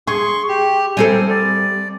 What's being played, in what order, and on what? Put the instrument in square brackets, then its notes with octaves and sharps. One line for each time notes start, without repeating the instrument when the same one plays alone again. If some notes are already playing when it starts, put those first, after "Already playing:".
[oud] G#4 [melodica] C6 C#6
[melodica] G4
[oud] G3 C4 A4 [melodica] G#5
[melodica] D5